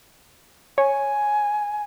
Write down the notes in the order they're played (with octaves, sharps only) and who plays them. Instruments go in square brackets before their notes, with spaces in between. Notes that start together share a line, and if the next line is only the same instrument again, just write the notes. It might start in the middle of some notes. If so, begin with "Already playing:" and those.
[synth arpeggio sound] C#5 [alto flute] G#5